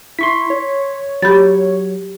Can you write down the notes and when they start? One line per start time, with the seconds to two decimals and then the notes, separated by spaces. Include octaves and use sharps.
0.19 E4 C6 C#6 B6
0.50 C#5
1.22 F#3 G4 B5 A6